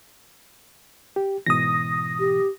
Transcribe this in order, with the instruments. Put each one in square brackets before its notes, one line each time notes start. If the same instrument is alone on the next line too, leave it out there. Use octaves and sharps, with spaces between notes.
[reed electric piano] G4
[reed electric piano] G#2 B2 E3 [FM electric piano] D#6 A#6
[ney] G4